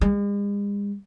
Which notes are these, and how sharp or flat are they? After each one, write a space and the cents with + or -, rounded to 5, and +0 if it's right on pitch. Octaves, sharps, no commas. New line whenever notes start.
G#3 -45